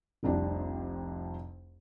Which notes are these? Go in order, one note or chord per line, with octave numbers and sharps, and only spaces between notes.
F1 C2 F2 D4 G4